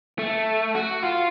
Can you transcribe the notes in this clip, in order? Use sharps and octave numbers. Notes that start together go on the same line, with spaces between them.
A3
F#4
F4